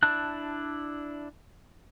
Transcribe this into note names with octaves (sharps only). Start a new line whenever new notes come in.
D4 E4 A5 F#6